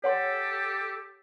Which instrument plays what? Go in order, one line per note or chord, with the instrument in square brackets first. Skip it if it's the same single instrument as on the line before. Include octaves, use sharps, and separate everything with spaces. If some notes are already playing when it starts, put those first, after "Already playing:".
[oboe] G4 [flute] A4 [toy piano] C#5 F#5 C6